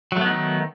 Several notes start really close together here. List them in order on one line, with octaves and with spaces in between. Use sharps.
F#3 A3 B3 D#4 D#3